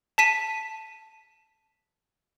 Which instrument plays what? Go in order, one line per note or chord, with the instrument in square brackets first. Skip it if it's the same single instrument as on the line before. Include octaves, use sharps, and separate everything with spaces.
[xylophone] A5 B6 D#7